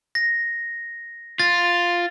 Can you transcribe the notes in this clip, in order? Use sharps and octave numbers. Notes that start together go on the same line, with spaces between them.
A#6
F4 A6